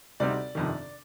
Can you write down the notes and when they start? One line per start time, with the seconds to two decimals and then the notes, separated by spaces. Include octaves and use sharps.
0.20 D2 C3 G3 C4 D#4 D5
0.55 G1 F2 C3 D#3